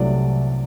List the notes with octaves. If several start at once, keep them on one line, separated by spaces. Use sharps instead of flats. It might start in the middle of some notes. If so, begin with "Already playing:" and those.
Already playing: C2 C3 F#3 A3 D5